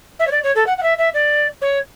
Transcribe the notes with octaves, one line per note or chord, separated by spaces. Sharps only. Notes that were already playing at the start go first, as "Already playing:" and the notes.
E5
C#5
D5
C#5
A4
F#5
F#5
E5
E5
D5
C#5